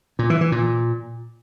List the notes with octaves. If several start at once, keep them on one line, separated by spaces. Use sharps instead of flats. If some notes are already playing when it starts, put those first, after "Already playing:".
A#2
E3
E3
A#2